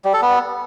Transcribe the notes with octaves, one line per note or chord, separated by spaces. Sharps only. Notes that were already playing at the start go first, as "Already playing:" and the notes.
G3
A4
B3